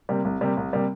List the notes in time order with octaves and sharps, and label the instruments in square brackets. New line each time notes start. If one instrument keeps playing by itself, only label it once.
[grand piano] C3 G3 A#3
C2
C3 G3 A#3
C2
C3 G3 A#3